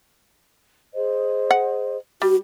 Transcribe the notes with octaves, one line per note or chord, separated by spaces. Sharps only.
G#4 C5 D#5
F#5
G3 F#4